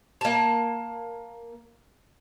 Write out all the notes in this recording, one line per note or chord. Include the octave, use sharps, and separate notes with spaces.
A#3 A5